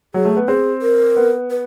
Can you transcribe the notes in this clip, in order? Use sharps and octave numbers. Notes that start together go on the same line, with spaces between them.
F#3 G#4
A3
B3
C4 G#4
A#4
B3
B4